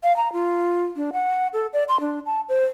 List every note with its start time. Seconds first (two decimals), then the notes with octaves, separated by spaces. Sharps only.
0.04 F5
0.17 A#5
0.33 F4
0.96 D4
1.13 F#5
1.53 A4
1.73 D5
1.89 C6
2.00 D4
2.26 A5
2.49 C5